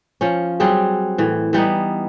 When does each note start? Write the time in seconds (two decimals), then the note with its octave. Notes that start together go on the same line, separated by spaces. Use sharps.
0.21 F3 C#4
0.60 F#3 G3 C4 G#4
1.18 A2 E3
1.53 E3 G3 B3 D#4